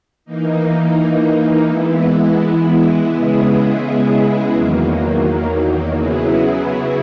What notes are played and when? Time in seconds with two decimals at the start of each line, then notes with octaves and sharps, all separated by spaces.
0.25 E3 A#3 D#4
1.67 E3 G#3 B3 E4
3.10 C#3 G#3 B3 E4 G#4
4.52 E2 D#3 F#3 A#3
5.94 C#3 F#3 B3 E4 G#4